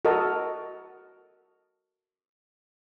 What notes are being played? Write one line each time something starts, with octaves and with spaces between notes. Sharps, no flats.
F#4 A4 A#4 D#5